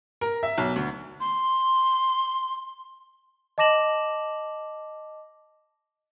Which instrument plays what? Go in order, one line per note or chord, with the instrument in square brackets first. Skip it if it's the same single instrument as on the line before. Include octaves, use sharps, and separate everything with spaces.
[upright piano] A#4
E5
B1
D2
[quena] C6
[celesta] D#5 A5 D6 A#6 E7 F#7